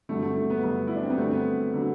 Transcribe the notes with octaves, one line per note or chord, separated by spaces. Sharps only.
G2 D3 F#3 A3
A3
A3
B3
G2 D3 F#3 B3
E4
D4
C4
B3
G2 D3 F#3 A3
C4
B3
D3 F#3